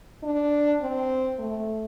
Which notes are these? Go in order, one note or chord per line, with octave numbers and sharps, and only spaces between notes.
D4
C4
A3